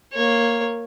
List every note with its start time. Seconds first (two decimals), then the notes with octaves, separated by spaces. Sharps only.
0.13 A#3 C#5